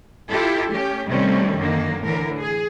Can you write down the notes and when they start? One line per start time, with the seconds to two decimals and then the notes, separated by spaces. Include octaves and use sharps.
0.30 E4 F4 G4 A4
0.70 A3 C#4 G4
1.07 C3 D#3 G3 A3 C4 C#4
1.57 F#2 D3 D#3 A#3
2.02 A2 D3 E3 A#4
2.38 G#4